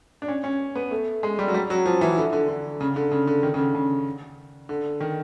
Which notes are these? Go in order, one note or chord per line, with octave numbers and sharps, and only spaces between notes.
D4
C#4
C#4
B3
A3
G#3
G3
F#3
G3
F#3
F3
E3
D3
D3
D3
C#3
D3
C#3
D3
D#3
C#3
D3
C#3
D3
D#3